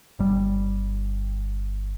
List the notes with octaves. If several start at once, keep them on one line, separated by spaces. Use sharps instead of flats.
G1 G3